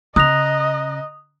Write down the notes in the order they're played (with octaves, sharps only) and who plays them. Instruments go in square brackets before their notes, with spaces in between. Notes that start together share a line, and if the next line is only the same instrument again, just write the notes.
[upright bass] C#3 [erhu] D#5 [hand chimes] A#5 F#6 A#6 [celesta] D#6 F7